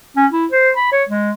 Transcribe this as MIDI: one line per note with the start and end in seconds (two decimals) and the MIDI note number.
0.17 0.26 61
0.32 0.46 64
0.52 0.71 72
0.77 0.91 83
0.92 1.04 73
1.09 1.31 56